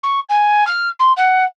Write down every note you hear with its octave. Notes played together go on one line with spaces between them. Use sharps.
C#6
G#5
F6
C6
F#5